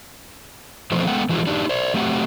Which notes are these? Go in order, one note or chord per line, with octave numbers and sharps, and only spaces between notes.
B2 E3 F3 A3 C4
G#3 A3 B3 F#5 G5
E3 F3 G#3 E4 F#4
D4 D#4 G4
C5 D5
F#3 A3 C4 G4 C#5 F#5